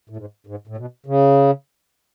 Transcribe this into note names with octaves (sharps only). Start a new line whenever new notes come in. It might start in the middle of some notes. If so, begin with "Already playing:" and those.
A2
G#2
G#2
A2
B2
C#3